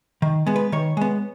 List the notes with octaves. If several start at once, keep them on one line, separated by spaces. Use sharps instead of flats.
D#3
G#3 B3
B4
D#3 C#5
G#3 B3